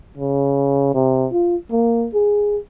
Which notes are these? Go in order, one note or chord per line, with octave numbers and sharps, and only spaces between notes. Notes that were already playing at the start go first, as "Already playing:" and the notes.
C#3
C3
F4
A#3
G#4